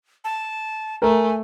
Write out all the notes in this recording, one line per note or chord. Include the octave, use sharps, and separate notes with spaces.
A5
A3 A#4 G#5